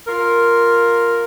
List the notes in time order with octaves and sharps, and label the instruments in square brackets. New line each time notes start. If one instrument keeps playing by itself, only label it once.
[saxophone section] F4 A#4